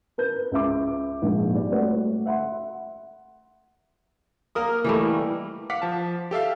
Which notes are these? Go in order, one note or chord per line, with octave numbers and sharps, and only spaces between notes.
A#4 B4 G6
C#2 E5 D6
A#1 G#2
G3 D5
A3 F#4 C#5 F#5
E5 F#5 C6
A#3 A#4 D#6
E3 G3 A3
F5 F#5 D6 B6
F3 A5
G4 A4 E5 F5